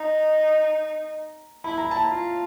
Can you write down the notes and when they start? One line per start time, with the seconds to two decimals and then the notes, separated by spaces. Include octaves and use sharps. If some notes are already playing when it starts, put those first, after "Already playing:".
Already playing: D#4 A#5
1.64 E4 B5
1.78 A#5
1.91 A5
2.05 F4 A#5